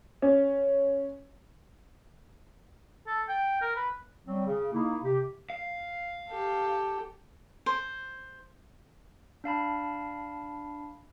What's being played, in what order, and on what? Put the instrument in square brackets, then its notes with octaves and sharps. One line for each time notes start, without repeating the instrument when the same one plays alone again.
[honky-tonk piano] C#4
[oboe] A4
G5
A#4
B4
[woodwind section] F#3 G3 C4
C#3
A#3 D#4 E4
C3 G4
[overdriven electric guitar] F5
[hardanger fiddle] G4 A4
[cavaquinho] C5
[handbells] D4 F5 A5 B5